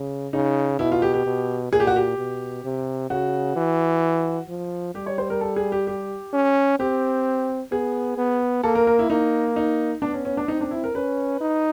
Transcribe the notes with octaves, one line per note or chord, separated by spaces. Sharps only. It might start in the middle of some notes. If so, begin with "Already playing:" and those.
Already playing: C#3
C#3 D#4
B2 E4
F4
G4
G4
B2
A#2 G#4
G4
F#4
G4
B2
C3
C#3 F#4
E3
F3
G3 G4
C#5
C5
A#4
A4
G#4
G4
G4
C#4
C4 G4
B3 G#4
B3
A#3 A4
A#4
A#4
E4
A#3 D#4
D#4
B3 D4
C#4
C#4
D4
C4 D#4
D4
E4
A#4
C#4 B4
D#4